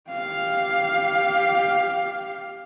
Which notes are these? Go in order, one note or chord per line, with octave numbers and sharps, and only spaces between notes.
G4 F5